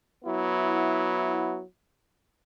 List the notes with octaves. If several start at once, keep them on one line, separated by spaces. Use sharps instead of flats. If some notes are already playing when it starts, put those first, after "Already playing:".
F#3 B3 E4